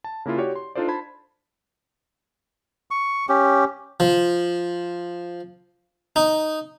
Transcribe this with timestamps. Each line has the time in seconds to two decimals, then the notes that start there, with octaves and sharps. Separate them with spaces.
0.04 A5
0.25 C#3 A#3 E4 F4
0.37 F#4 G4 C#5 D5
0.56 C6
0.75 D4 D#4 F4 A4 C5 D5
0.88 C5 A5 B5 G#6
2.91 C#6
3.29 C#4 G4
4.00 F3
6.16 D#4